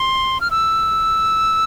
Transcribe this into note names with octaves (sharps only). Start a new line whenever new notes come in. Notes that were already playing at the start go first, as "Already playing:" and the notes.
Already playing: C6
F6
E6